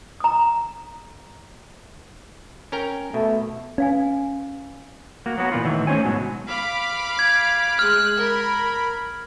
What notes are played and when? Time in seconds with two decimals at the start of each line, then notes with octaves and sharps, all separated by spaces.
0.20 A#5 D#6
2.72 C#4 A#4 G5
3.14 B2 A3
3.78 C#4 B4 F5 G#5
5.26 A#3 F#4
5.38 F#3 B3 F#4 B4
5.52 A#2 E3 A#3 F4
5.65 A2 D#3 E3 F#3
5.87 A3 C#4 C5 C#5 G#5
6.05 G#2 B2 F#3
6.48 F5 B5 D6
7.19 G#6
7.79 G#3 F6 F#6
8.18 A#4 B5